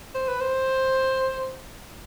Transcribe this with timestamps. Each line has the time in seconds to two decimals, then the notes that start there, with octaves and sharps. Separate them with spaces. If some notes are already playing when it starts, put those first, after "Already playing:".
0.15 C5
0.28 B4
0.41 C5